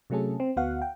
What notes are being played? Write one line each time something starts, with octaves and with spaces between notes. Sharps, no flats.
C3 F#3 A3 C#4 G#4 A4
C4
D2 B3 F#4 F5 F#5
G5